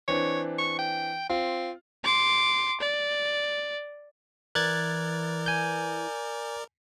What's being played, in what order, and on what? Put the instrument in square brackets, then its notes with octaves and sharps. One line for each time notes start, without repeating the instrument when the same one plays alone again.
[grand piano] E3 C4 D4 [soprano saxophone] C#5
[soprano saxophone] C#6
G5
[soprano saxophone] C4 [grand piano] F4
[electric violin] C6 D6
D5
[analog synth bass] E3 [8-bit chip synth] A#4 D5 [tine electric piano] F#6 G#6 A6
[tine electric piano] G#5 G6